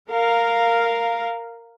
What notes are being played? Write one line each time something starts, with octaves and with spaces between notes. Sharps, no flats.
A#4 F5